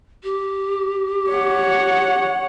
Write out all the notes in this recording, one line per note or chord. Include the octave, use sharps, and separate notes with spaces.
G4
C#5 F#5